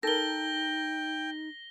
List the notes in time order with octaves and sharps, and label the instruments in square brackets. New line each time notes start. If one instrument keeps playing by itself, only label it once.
[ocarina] D#4 [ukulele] A4 A#4 [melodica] G5 [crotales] A#6 G7